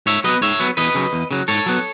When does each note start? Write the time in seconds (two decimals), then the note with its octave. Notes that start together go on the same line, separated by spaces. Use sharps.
0.06 G#2 C#5 E5
0.24 F#3 B3 B4 D#5
0.41 G#2 C#5 E5
0.60 F#3 B3
0.77 E2 B4 D#5
0.95 C#3 F#3
1.13 E2
1.31 C#3 F#3
1.48 G#2 A4 C#5
1.66 F#3 B3